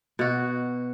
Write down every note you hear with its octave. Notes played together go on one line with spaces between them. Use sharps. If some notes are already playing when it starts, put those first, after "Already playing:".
B2 F#4